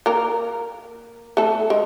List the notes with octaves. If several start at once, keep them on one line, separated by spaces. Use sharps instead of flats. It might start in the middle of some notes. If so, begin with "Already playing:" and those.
A#3 A#4
A3 A4
G#3